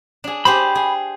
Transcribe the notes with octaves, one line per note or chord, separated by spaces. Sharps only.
D4 G#4
G4 G#4 C5 B5
G#4